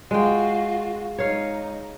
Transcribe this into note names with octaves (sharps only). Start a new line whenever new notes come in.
G#3 F4 F#4 G5
G#3 D#4 C#5 F5